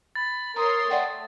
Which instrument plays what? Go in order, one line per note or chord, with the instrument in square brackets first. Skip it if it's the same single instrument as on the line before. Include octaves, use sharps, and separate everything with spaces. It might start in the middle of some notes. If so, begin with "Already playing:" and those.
[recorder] B5 [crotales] A6
[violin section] A#4 C#5 C6 [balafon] A#5 [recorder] D#6
[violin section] A3 [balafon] D5 F#5 G5